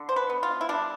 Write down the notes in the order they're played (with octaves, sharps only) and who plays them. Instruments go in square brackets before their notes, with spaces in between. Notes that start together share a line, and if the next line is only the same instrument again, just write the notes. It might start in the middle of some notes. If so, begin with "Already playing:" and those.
Already playing: [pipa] D3
C5
B4
B3
F4
E4
G3 D4